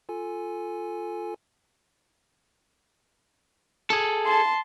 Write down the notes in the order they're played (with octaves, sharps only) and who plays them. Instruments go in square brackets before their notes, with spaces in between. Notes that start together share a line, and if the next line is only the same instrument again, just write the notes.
[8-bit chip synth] F4 A4 G#5
[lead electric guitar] G#4 A4
[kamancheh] A5 C6